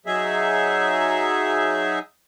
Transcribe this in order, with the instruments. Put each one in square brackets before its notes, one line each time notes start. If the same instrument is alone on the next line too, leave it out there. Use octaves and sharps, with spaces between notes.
[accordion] F#3 D#4 G#4 E5